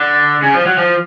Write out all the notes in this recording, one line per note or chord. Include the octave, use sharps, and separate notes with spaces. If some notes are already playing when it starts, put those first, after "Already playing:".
Already playing: D3
C#3
F3
F#3
F3